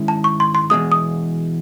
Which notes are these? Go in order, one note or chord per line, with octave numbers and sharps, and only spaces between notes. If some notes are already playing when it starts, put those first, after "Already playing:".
Already playing: G#2 D#3 G#3 C#4 E4
A5
C#6
C6
C6
E2 B2 G#3 D#6
D#6